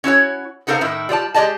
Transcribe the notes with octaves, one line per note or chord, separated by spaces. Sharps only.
C#4 E4 F#4 C#5
B3 D#4 A4 A#4 C5 F5
A2 D#3 E4
G3 F4 D5 A5
G#3 G4 D5 D#5 A5